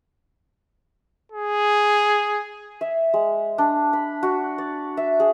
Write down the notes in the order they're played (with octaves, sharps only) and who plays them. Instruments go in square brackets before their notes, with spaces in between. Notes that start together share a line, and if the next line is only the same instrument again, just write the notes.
[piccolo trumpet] G#4
[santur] E5
G#3
D4
B5
F#4
D5
E5
G#4